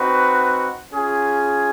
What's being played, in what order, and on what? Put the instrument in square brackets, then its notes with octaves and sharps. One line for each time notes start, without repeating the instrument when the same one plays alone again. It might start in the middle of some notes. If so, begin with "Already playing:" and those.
Already playing: [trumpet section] C4 D#4 F#4 B4
C#4 F4 G#4